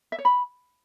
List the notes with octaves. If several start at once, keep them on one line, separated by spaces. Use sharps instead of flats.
E5
C#5
B5